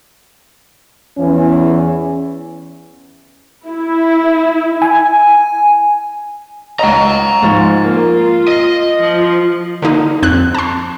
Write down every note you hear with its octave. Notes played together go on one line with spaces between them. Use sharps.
E2 E3 C#4
E4
G#5
C#2 D#5 F#5 A#5
G#2 F3 C#6
A#3 F4
D#5
F3
D3 A#3 D#4
F2 C4 F#6
A5 C6